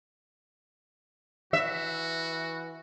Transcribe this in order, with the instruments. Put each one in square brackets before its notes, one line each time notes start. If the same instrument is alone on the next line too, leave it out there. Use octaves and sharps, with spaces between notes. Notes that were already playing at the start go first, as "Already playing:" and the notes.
[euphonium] E3 [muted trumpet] F#4 [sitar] E5